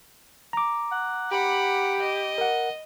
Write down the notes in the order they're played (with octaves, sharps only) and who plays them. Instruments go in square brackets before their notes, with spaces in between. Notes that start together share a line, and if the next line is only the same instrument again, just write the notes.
[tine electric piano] A#5 D6
[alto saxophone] F#5
[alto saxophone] G4 [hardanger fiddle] F#5 B5
[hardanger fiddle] D#5
[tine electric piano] A#4 F#5